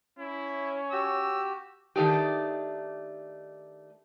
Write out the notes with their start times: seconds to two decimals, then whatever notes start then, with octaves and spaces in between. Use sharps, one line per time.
0.19 C#4 E4
0.92 F#4 G4 E6
1.96 D#3 A3 D4 D#4 G4